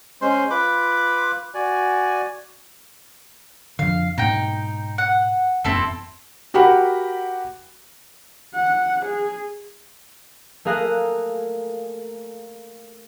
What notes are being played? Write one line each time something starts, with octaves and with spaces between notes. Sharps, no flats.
G#3 C#4 C5 C6
F4 B4 B5 D6
F#4 D5 G#5
F2 D3 F5
G#2 B2 D#4 G5
F#5
E1 F#2 B3 C4 E4 A4
F#4 G4 A#4 F#5 B5
F#5
G#4
A3 A#3 G#4 F5 A#5 F#6